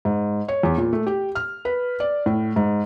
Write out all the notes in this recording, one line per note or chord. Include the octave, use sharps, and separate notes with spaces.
G#2
C#5
E2
A#2
A3
G4
F6
B4
D5
A2
G#2